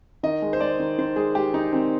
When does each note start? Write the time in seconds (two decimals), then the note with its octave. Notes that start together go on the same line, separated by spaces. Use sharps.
0.23 D#3 D#5
0.42 G#3
0.53 C5
0.60 G#3 D5
0.79 D#3
0.98 D#3 C5
1.16 G#3 G#4
1.35 G#3 G4
1.54 D#3 D#4
1.72 D#3 C4